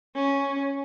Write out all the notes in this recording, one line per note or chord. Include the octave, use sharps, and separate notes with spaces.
C#4